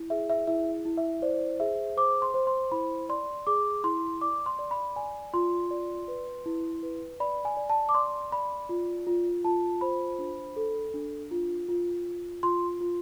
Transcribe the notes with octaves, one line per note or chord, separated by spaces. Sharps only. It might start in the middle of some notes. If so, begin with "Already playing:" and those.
Already playing: E4
G#4 E5
E5
E4 E5
E4
E5
C5 D5
G#4 E5
C5 D6
C6
C5
C6
E4 B5
D5 C6
G#4 D6
E4 C6
D5 D6
C6
D5
B5
D5 G#5
F4 C6
D5
B4
E4
B4
D5 B5
G#5
D5
A5
D6
D5 C6
D5 B5
F4
F4
F4 A5
C5 B5
D4
A4
D4
F4
F4
F4
F4 C6
F4